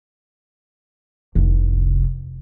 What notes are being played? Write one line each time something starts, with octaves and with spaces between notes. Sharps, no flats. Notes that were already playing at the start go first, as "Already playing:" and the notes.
F1 C2